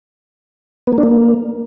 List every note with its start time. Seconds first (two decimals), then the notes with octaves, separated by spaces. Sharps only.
0.87 B3
0.93 A#3
0.98 D4
1.03 A#3